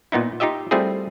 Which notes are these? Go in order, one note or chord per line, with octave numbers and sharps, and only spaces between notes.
A#2 B3 D#4 E4
D#4 F4 G4 D#5 E5
G3 A3 C4 E4 F4 G#4